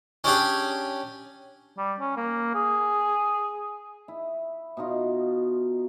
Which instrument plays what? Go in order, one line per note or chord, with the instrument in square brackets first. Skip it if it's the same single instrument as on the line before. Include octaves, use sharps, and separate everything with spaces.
[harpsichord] C#4 D4 G4 G#4
[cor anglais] G3
C#4
A#3
G#4
[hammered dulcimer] E4
B2 D#4 F4